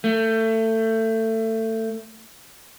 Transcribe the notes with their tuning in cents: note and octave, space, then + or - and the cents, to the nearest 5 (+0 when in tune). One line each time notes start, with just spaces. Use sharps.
A3 +25